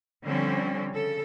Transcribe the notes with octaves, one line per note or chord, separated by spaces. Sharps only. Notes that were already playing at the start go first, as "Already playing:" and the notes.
D3 F3 G3 C4 C#4
C#3 A4